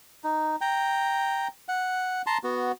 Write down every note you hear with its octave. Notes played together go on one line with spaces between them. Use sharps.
D#4
G5 A#5
F#5
A5 A#5 C6
B3 F#4